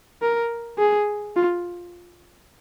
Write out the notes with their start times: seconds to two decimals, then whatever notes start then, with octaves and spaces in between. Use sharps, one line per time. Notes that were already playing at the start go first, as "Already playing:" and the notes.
0.22 A#4
0.79 G#4
1.36 F4